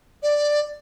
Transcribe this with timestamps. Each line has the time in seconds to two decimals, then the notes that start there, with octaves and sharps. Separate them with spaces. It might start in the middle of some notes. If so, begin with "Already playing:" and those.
0.23 D5